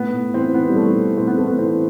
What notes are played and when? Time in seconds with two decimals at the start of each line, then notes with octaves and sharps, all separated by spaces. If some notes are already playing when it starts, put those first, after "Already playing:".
Already playing: A2 B3
0.13 A2
0.34 E3 C4
0.54 E3 B3
0.68 G3
0.75 E3 A3
0.96 E3
1.17 A2 C4
1.27 B3
1.37 E3 A3
1.47 B3
1.59 E3 C4